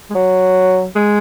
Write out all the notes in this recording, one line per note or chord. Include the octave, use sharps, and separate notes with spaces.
G#3
F#3
G#3